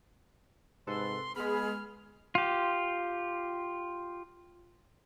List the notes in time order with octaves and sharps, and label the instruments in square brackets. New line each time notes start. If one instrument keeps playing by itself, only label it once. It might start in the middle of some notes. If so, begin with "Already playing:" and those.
[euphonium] G#2 [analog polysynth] C3 A4 B4 [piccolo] C6
[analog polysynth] G#3 B5 [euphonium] B3 [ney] G#4 [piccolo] F6
[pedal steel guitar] F4 G4